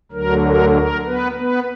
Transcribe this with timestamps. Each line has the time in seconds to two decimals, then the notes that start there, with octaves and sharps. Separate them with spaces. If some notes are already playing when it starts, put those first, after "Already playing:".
0.12 D2 D3 F#3 A#4
0.43 A#4
0.75 A#4
1.06 B3 B4
1.38 B3 B4